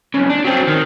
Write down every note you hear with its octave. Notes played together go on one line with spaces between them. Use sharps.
B1 C#3
D4
F#3 C4
D#3